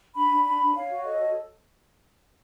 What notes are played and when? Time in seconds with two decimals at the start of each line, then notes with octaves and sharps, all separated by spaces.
0.15 D4 B5
0.30 D4
0.45 D4 B5
0.60 D4
0.75 C#5 F5
0.89 F#4
1.04 A4 D#5
1.19 C#5